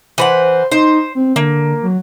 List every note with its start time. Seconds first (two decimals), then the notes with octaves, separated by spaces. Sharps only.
0.18 E3 B4 C5 F#5
0.71 D#4 C5
1.15 C4
1.36 D3 A#3
1.83 F#3